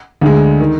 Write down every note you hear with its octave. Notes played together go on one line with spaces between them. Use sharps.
D2 D3 G#3
D#3